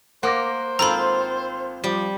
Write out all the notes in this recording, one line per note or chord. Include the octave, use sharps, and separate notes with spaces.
A#3 C5 F#5 D6 A#6
G#1 C4 F4 A4 A#5 B5 E6
F3 G3